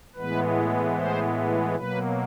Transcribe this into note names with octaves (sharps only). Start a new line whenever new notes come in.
A2 E3 G#3 B3 B4
C5
B2 F#3 A#3 B4